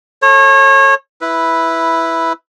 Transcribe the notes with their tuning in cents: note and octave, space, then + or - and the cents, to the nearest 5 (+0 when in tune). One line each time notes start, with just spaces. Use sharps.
A4 +0 C#5 -30
E4 +0 B4 +0